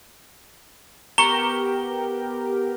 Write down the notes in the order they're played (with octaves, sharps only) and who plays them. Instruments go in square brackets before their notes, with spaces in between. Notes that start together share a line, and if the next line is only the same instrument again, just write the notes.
[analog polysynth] B3 G4 A#4 [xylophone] A#5 C#6 C#7 [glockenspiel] G7